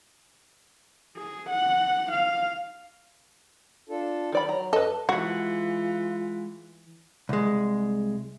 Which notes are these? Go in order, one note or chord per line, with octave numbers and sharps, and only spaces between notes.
G#4
F#5
F5
D4 F4 A4
D#3 D5 B5
F#3 A#5
F#2 A4 B4 D#5
E3 G#3 F4 F#4 F#5
C2 G#3